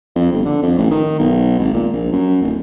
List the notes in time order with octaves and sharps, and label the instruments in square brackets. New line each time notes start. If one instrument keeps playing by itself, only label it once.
[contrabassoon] F2
G1
D3
F2
A1
D#3
B1
G#1
A#2
A#1
F#2
D1